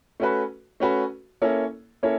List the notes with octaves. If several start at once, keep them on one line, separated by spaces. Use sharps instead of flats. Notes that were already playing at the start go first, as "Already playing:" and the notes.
A3 C#4 F#4 B4
A3 C#4 F#4 B4
A#3 C#4 E4 A4 C#5
A#3 C#4 E4 A4 C#5